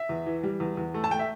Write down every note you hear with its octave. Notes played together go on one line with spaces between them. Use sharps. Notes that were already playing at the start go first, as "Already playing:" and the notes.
Already playing: E5
E2
E3
G3
E2
E2
A3
A5
A3 G5
E5